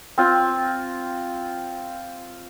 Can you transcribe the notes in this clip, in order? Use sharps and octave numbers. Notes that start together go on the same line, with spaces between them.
C4 F4